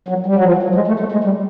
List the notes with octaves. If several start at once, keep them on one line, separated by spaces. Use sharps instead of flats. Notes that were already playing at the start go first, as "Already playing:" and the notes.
F#3
G3
F#3
F3
F#3
F#3
G#3
A3
A3
G#3
G3